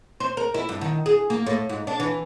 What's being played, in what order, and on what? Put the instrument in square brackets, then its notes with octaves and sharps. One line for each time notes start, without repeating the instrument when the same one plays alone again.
[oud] C5
A#4
E4
G2
D#3
G#4
A#3
A2
G#2
D4
E3